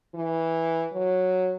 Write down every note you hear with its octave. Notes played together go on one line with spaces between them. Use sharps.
E3
F#3